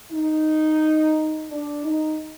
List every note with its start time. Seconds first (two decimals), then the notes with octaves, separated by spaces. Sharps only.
0.12 D#4
1.49 D4
1.83 D#4